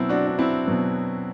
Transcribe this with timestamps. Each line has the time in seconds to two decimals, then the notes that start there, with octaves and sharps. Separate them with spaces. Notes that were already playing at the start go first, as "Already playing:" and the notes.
Already playing: B2 F#3 B3 C4 E4
0.09 D4 F#4
0.27 D4
0.39 C4 E4
0.66 B2 F#3 B3